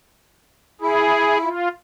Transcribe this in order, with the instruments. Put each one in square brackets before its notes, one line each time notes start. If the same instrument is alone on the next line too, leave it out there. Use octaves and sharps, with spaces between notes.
[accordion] E4 [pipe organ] G#4
[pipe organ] F4